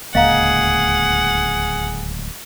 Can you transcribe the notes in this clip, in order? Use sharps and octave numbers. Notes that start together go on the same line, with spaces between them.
D1 C#2 A#3 G#4 D#5 F5 F#5 A#5